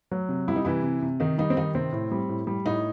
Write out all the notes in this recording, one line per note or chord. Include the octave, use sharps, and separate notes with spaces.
F#3
C3
G3 E4
D#4
C3 E3 E4
C3
C3
D#3 D#4
G3 D#4
C4
D#3 D#4
C3 C4
A2
G3
A2
G3
A2 D#4